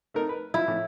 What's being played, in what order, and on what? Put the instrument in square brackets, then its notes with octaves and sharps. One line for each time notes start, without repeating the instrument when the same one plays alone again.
[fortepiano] A3 D#4 A#4
B4
[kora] E4 [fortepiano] F4
[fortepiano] A2